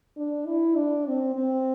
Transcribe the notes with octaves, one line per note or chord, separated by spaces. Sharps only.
D4
E4
D4
C4
C4